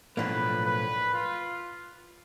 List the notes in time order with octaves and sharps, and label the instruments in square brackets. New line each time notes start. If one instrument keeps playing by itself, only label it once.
[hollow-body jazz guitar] B1 A2 F3 A#3 D4 [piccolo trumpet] B4
[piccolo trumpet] B4
F4